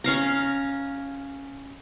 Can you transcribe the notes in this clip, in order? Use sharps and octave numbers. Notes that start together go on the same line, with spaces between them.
C#4 F5 A#5